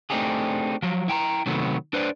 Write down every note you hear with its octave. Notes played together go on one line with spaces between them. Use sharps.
A3 C4 D4 D#4 G4 G#4
F3 F#3
E4 G5 A5 A#5
C3 D#3 F#3 A3 B3
D4 B4 C5 D5